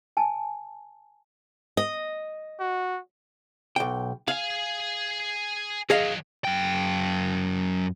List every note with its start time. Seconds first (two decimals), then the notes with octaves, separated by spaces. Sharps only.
0.17 G#5 A5
1.77 D#5
2.60 F#4
3.76 B1 G5
4.28 G#4 F5 G#5
5.90 D#3 F#3 G#4 D#5 F5
6.45 F#2 G5